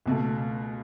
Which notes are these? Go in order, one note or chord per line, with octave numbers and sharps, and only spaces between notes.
C#2 B2 A3